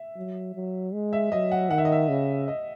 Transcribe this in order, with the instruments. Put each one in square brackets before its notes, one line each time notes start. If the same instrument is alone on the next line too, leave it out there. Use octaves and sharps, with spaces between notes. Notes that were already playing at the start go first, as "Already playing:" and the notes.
Already playing: [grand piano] E5
[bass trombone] F#3
F#3
G#3
[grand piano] E5
[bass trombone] F#3 [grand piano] D#5
[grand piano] F#5
[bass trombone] D#3 [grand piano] F#5
[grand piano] E5
D#5
E5
[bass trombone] C#3
[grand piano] D#5